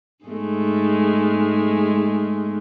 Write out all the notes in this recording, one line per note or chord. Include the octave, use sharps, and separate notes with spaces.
G#2 G#3 A3